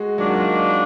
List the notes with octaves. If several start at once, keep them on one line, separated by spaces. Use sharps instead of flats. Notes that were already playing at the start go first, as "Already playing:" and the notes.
Already playing: G#3 F#4 G#4
D#3 F#3 A#3 D4 F4 F#4